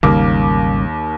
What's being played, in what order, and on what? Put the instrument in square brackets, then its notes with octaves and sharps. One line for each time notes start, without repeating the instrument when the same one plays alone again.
[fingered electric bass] G#1 C#3 G3 [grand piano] D#2 A#3 D6